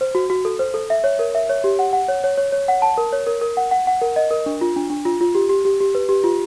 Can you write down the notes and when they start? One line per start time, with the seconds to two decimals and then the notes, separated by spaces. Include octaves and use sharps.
0.01 C5
0.15 F#4
0.30 F#4
0.45 A4
0.59 C5
0.74 A4
0.90 E5
1.04 C#5
1.19 A#4
1.35 E5
1.49 C#5
1.64 G4
1.79 F#5
1.93 F#5
2.08 C#5
2.24 C#5
2.37 C#5
2.52 C#5
2.68 F#5
2.82 A5
2.98 A#4
3.13 C#5
3.27 A#4
3.41 A#4
3.57 F#5
3.71 F#5
3.87 F#5
4.02 A#4
4.16 D#5
4.31 A#4
4.46 D4
4.61 F4
4.76 D4
4.90 D4
5.05 F4
5.21 F4
5.35 G4
5.49 G4
5.65 G4
5.80 G4
5.95 B4
6.09 G4
6.24 F4